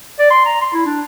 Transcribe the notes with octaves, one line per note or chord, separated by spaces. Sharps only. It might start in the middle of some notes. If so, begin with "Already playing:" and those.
D5
C6
A#5
C6
E4
D4